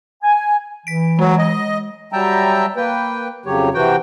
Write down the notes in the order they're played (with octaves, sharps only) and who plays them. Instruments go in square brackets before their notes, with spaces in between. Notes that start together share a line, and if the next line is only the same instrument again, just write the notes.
[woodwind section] G#5
[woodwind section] E3 [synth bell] B6 D7
[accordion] F#3 [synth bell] G#3
[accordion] D#5
[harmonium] F#3 G3 E5 G5 A5 A#5
A#3 B4 G5
F2 C#3 F#3 G4 C#5
C3 E3 F#4 G5